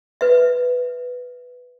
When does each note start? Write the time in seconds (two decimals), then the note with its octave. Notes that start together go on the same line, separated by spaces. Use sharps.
0.21 B4 E5